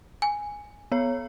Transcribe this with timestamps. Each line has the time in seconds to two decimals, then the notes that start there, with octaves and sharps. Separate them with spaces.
0.22 G#5
0.92 B3 C#5